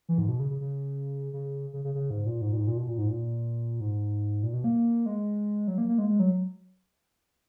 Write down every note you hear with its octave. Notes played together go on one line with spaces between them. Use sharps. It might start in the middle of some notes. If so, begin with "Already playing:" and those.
E3
G#2
B2
C#3
C#3
C#3
C#3
C#3
C#3
C#3
G#2
A#2
G#2
A#2
G#2
A#2
B2
A#2
G#2
A#2
G#2
A#2
B2
A#3
G#3
F#3
A#3
A#3
G#3
G#3
F#3